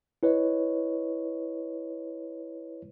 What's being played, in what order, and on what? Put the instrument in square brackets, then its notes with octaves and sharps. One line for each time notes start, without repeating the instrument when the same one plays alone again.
[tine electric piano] E4 B4 C#5 D#5